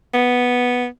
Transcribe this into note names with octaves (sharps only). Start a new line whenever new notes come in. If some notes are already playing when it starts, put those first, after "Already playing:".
B3